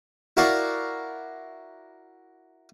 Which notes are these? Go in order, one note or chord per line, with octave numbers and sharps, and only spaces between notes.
E4 F#4 A#4 D5 F5